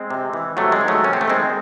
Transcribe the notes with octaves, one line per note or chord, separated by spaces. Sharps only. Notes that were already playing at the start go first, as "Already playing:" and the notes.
Already playing: G#3 C4
C3
E3
C3 F#3 A3
G#3
D#3
F#3 A3
C3 C#4
C4
A3
D#3 G#3 C4